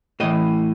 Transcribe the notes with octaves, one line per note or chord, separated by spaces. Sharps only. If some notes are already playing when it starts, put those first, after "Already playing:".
A2 E3 D#5